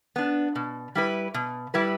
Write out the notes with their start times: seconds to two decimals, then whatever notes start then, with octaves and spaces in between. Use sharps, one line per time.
0.16 B3 D4
0.55 B2
0.95 G3 E4 B4
1.34 B2
1.74 G3 E4 B4